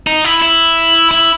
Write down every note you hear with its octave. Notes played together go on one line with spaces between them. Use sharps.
D#4
E4
E4
E4